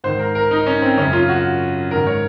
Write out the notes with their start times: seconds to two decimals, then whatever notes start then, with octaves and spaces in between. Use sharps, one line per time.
0.04 G#2 D#3 C5
0.19 A#4
0.35 A#4
0.51 D#4
0.67 C#4
0.82 C4
0.97 F#2 C#3 C#4
1.13 F4
1.29 F#4
1.91 G#2 D#3 A#4
2.07 C#5